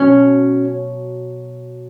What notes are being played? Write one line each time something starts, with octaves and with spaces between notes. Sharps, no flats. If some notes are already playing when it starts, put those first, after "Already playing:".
Already playing: B2 F#3 C#4